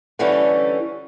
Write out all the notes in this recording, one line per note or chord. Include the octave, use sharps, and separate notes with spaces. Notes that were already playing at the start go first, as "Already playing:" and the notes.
D3 E3 G3 A3 C#4